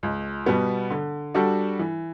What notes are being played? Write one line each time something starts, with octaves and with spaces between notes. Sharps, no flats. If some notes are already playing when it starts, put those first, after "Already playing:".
C#2
B2 G3 B3
D3
G3 D4 F#4 A4
E3